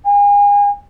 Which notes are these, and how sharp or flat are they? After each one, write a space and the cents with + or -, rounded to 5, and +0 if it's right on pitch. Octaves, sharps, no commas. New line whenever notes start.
G#5 -35